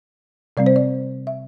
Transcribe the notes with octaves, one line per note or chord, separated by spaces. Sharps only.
C3 G3 C4 D5
C5
D5
E5